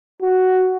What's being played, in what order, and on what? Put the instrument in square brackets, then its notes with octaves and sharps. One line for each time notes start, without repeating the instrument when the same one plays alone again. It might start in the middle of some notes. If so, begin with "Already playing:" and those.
[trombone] F#4